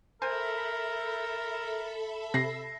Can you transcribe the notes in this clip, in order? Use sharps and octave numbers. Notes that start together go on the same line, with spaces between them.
A4 A#4 C5 E5 G#5 B5
C3 A#6 C7